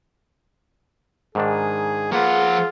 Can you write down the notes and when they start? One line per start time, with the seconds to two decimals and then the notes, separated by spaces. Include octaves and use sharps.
1.35 G#2 D#3 D4 G#4
2.12 F3 A#3 F4 G#4 B4 F#5